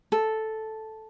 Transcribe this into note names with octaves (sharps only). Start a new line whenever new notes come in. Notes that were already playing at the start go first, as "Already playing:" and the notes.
A4